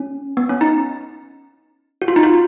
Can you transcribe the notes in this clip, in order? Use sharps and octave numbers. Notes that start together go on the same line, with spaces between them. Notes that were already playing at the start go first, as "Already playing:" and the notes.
Already playing: C#4
B3
C#4
D#4
F#4
F4
D#4
F4